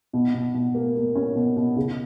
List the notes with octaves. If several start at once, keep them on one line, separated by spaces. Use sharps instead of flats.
B2
B2
B2
A#3
A#3
C#4
B2
B2
C#3